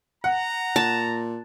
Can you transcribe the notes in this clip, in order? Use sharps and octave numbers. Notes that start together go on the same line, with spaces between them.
F#5 A#5
A#2 A5